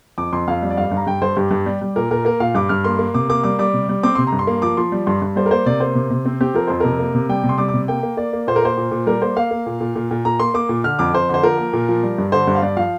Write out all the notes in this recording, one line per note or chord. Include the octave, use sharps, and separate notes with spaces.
F2 D6
F2 C6
F2 F5
G3
D5
G2 F5
G2
A#5
G2 G5
G2 C5
G2 G4
G2
G3
G3
A#2 A#4
A#2 A#4
A#3 A#4
A#2 F5
G2 D6
G2 F6
A#3 C6
A#3
C3 D6
A#3 D6
G3 D6
G3 D6
C3
G3
C4 D6
C3 C6
A#5
G2
C6
A#3
F3 D6
F3 C6
G3
G2 C6
G2
G3 C5
A#4
A#3 C5
C3 D5
A#3 C5
C3
C3
C4
C4 G4
F3 A#4
F2 C5
C3 A#4
A#3
C3
G3 G5
C3
C6
G3 D6
D6
C3
A#3 G5
A#3
A#3 D5
A#3
A#2 C5
A#4
A#3 C5
A#2
A#2
G3 A#4
A#3 C5
A#3 F5
A#3
A#2
A#2
A#2
A#2
A#2 A#5
A#3 C6
A#3 D6
A#2
D3 F6
F2 D6
F2 C5
D3 C5
F3 A#4
A#3
A#2
F3
G3
G2
D3 C5
G2
F5
G2 D5
F3 F5